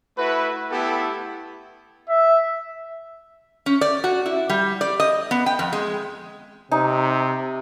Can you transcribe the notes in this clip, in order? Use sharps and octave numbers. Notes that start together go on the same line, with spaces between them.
A3 E4 F#4 B4
A3 B3 E4 G4 A4
E5
C#4
D5
F#4
E4
G3
D5
D#5
B3
G5
F2
G#3
C3 D#4